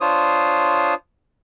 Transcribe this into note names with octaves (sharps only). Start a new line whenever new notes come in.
D4 F4 C5 C#5 D#6